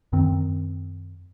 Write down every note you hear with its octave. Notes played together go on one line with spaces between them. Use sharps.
F#2 D#3 C4